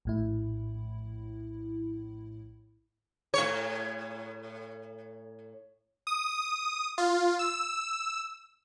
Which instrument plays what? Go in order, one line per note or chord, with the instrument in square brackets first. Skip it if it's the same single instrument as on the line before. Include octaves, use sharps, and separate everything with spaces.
[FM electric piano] A#1 A2 E4
[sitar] A2 C#5
[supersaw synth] D#6
F4
E6